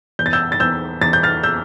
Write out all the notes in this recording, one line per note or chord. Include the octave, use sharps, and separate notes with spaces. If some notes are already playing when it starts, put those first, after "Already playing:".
E2 G6
A6
E6 G6
A6
E2 E6 G6
E2 A6
G6
F6 A6
E6 G6